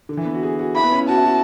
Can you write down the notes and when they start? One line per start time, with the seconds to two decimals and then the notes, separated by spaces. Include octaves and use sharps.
0.09 D3
0.17 E3
0.25 B3
0.34 F#4
0.43 G#4
0.59 F#4
0.76 E4 B5
0.84 B3
0.92 C#4
1.01 E4
1.08 F#4 A5
1.17 E4
1.25 F#4